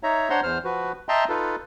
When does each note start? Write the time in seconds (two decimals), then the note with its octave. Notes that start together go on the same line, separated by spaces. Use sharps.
0.03 D#4 C#5 E5 A#5
0.30 D4 C5 C#5 F#5 A#5 C6
0.43 E2 C5 F6
0.65 F3 F#4 B4
1.09 D#5 E5 G5 A5 A#5 C6
1.29 D#4 F4 A4 B4